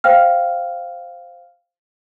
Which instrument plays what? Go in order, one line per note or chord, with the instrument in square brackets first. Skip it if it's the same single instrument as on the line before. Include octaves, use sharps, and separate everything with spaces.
[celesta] C5 F5 G5 F6